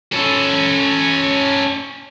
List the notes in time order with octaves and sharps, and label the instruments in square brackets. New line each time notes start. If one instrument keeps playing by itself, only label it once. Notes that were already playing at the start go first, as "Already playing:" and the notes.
[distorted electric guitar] C#4 A4